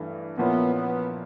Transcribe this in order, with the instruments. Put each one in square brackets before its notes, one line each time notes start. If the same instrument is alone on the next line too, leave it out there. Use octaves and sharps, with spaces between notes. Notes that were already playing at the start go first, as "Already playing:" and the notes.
Already playing: [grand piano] G2 E3 A3
[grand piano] A#2 F3 A#3 C#4 E4 [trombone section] B3
[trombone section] B3